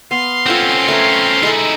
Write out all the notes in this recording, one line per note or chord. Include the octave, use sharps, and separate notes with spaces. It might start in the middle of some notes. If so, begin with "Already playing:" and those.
B3 F5 C6
C4 C#4 F4 A4 F#5
A3 A#4 B4
G#3 D#4 E4 G#4 A4